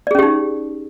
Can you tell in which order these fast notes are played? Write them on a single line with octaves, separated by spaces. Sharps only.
D5 G#4 C#4 G4 D#4